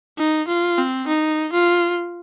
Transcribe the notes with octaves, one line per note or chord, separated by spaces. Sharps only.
D#4
F4
C4
D#4
F4